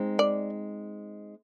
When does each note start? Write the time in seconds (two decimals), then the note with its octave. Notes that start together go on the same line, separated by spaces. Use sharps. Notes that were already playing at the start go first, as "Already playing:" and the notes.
Already playing: G#3 C4 D#4
0.19 D5